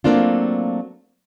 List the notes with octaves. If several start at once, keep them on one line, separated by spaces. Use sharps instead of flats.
F#3 A3 A#3 C4 D4 F4